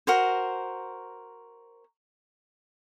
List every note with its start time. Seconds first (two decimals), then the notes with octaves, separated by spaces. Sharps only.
0.07 F#4 A#4 C5